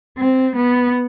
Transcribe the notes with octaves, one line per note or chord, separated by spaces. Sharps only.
C4
B3